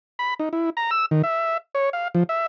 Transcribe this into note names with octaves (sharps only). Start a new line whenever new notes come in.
B5
D#4
E4
A#5
E6
D#3
E5
C#5
F5
F3
E5